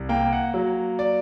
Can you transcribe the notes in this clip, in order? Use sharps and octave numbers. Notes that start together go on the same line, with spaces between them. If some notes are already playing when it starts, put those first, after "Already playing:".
Already playing: C2
A#3 G5
F#5
F#3
D5